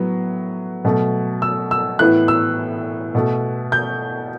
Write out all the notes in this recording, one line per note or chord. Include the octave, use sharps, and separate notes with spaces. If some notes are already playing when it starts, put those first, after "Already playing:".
Already playing: A2 F#3 B3
B2 F#3 A3
E6
E6
A2 E3 B3 F#6
E6
B2 A3
G6